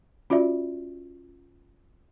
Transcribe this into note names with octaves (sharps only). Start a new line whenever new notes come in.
C#4 F4 F#4 D5 E5